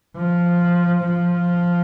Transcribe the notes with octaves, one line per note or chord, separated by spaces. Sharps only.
F3
F3